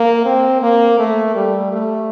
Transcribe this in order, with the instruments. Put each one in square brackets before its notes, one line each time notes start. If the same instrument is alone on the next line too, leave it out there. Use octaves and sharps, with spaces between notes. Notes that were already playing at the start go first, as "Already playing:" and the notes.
Already playing: [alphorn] A#3
C4
A#3
A3
G3
A3